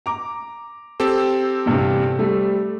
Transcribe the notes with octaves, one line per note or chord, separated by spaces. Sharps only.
A#5 D6
C4 G4 A4
E2 G2 C3
G3 A3